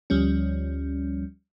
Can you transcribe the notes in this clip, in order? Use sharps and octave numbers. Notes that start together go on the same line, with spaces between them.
D2 F3 G3 C#4